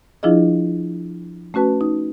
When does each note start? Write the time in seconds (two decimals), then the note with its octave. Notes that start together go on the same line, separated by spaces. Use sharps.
0.23 F3 D4 E4 F4 G#4 D#5
1.54 A3 C#4 F#4 B4 A5
1.81 D#4